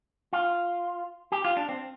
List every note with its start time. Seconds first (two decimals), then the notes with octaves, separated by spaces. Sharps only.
0.33 F4
1.32 G4
1.45 F4
1.57 D4
1.69 C4